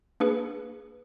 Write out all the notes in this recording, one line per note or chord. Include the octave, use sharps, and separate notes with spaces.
A#3 D4 G#4 B4